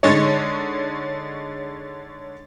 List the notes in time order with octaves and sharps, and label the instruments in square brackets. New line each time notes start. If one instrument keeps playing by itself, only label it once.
[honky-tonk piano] D3 G#3 D#4 [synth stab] C#5 A6